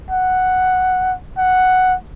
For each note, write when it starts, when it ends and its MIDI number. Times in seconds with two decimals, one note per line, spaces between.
0.11 1.14 78
1.38 1.95 78